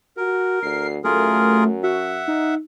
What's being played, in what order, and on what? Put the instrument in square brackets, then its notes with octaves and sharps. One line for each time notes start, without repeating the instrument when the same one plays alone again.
[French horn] F#4 [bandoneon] A#4
[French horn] D2 [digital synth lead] C7
[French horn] F#2 [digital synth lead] A3 [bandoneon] F4 G#4 A#4
[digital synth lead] F#4 [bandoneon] E5 F#5
[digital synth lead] D#4